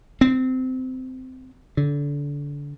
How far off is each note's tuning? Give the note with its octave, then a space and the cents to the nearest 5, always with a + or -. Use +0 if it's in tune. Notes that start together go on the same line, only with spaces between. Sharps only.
C4 -20
D3 -25